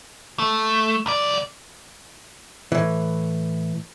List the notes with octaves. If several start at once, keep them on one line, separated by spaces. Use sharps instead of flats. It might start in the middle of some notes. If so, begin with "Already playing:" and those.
A3
C2 D5
A2 E3